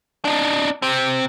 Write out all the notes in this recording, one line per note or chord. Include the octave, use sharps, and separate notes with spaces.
D4 D#4
C3 C4